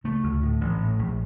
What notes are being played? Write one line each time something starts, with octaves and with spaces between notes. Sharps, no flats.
C#3 A3
D2
A2
A1
A2
A#1